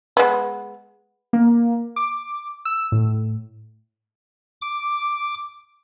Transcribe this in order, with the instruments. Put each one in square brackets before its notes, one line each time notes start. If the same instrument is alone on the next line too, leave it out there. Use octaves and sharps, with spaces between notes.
[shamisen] G#3 B3
[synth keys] A#3
D6
E6
A2
[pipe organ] D6